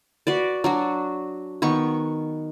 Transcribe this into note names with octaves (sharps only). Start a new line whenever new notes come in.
F#4 B4 D5
F#3 D4 F#4
D#3 B3 C#6